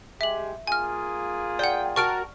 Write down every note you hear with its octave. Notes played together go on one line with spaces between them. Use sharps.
G#3 G4 E5 F#7
A#3 F4 G#4 G#5 F6
D5 F#5 G5
F#4 A#4 A5 C#6 F6 D7